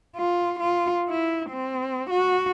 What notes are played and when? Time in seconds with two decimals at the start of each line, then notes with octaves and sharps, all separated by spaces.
0.16 F4
0.60 F4
1.09 E4
1.50 C4
2.11 F#4